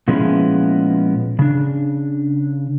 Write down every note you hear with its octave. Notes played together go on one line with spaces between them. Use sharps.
A#2 F3 G#3 B3 C#4 E4
C#3 D4